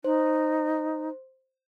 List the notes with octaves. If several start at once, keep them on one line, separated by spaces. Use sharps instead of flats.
D#4 C5